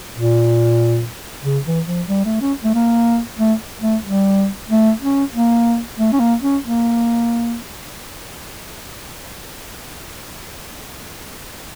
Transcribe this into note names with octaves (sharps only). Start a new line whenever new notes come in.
A#2
C#3
E3
F3
G3
A3
C#4
A3
A#3
A3
A3
G3
A3
C#4
A#3
A3
C#4
A#3
C#4
A#3